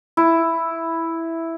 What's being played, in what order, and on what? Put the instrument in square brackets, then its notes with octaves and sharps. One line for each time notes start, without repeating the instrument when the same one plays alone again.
[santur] E4